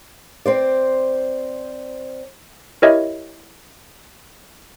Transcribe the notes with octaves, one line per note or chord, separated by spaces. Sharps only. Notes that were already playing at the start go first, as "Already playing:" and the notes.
C4 C5 D5
E4 G4 A#4 C#5 D#5 E5